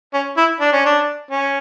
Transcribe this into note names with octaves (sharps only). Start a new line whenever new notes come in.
C#4
E4
D4
C#4
D4
C#4